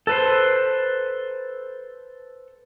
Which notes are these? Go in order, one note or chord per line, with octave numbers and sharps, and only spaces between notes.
A4 B4 C5